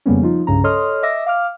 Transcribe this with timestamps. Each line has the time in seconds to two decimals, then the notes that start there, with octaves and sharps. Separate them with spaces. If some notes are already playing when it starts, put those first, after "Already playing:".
0.06 F2 C#3 G3 A#3 B3 C#4
0.22 F3 D#4 F4
0.47 C2 G2 C#3 C#4 A#5
0.64 A4 C#5 D#5 C6 D#6 F6
1.03 D#5 E5 D6 E6 A#6
1.26 F5 D6 F6